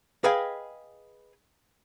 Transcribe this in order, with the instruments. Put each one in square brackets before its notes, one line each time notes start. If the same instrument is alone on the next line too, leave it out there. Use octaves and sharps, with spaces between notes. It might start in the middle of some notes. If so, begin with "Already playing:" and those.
[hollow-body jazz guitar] G#4 B4 D#5 F5 G5 G#5